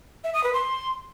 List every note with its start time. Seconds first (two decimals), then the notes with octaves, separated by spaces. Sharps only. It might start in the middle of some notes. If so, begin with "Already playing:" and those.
0.24 E5
0.34 D#6
0.44 B4
0.54 C6